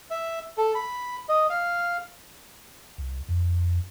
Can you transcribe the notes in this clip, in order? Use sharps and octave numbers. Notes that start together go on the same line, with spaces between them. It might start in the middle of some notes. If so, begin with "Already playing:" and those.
E5
A4
B5
D#5
F5
C2
F2